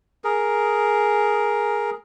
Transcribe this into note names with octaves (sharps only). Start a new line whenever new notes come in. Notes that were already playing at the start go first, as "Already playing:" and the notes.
G#4 A#4